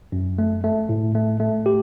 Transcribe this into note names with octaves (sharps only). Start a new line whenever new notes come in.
F#2
A3
A3
A2
A3
A3
G4